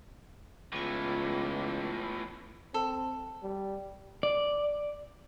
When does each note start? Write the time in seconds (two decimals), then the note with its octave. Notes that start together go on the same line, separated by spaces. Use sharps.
0.72 C#2 A2 E3 B3 F4
2.74 C4 A4
3.43 G3
4.23 D5